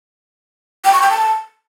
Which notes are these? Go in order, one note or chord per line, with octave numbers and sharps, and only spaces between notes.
G5
C#6
G5
A5